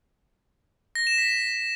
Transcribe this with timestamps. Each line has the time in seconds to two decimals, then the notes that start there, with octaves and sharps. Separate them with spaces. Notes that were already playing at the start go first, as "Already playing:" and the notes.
0.95 A#6
1.07 E7
1.18 B6